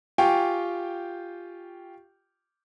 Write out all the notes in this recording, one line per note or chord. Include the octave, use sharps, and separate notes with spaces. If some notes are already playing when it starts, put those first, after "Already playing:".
F4 G4 G5 G#5 C#6